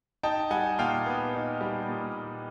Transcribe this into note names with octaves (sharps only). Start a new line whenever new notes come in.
D#4 G5 A5
G3 F#5 G#5
A#2 F5 G5
B3
D#4
G3
A#2